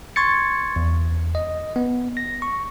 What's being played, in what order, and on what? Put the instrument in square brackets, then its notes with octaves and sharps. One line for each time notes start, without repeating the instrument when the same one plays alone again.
[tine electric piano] C6 C#6 G#6 A6 C#7
E2
D#5
B3
A#6
C#6